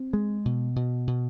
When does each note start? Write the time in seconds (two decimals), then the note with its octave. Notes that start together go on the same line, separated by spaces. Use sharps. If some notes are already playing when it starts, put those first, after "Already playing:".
Already playing: C4
0.13 G#3
0.45 B2
0.76 B2
1.07 B2